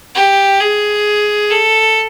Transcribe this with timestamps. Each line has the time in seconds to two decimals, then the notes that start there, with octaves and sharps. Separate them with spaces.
0.15 G4
0.61 G#4
1.50 A4